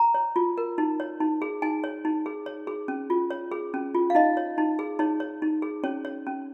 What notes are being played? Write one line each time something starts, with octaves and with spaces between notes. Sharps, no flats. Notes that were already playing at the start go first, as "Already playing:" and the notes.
Already playing: A#5
C#5
F4
A#4
D#4
C#5
D#4
G#4
D#4 G#5
C#5
D#4
G#4
C#5
G#4
C#4
F4
C#5
G#4
C#4
F4
F5
D#4 D#5
C#5
D#4
G#4
D#4 C#5
C#5
D#4
G#4
C#4 C#5
C#5
C#4